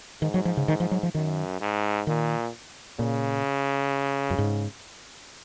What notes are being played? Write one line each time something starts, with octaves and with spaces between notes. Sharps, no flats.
G#2 D#3
F#3
F3
C#3
D#3
F3
F#3
F3
F#2 D#3
G#2
A#2 D#3
A#2 C#3
F#2
G#2